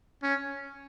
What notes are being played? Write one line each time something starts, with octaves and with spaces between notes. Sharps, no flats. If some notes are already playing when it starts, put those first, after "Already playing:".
C#4